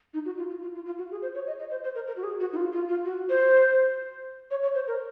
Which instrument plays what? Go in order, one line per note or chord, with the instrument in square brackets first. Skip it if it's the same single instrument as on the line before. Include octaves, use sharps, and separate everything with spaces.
[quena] D#4
F#4
F4
F4
F4
F4
F4
F#4
G#4
C5
C#5
D#5
D#5
C5
C5
A#4
A#4
F#4
G#4
F#4
D#4
F4
F4
F4
F#4
C5
C#5
C#5
C5
A#4